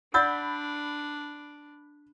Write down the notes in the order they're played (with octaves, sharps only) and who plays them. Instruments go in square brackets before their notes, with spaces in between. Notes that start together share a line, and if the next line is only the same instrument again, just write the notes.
[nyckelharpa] D4 [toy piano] D5 F#5 E6 [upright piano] B5 G6 A6